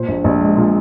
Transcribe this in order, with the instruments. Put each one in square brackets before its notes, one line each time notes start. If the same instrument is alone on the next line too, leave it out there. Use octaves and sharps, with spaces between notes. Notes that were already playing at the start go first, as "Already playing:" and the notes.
Already playing: [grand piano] A#2 C5
A#1
A#1
G#3
A#2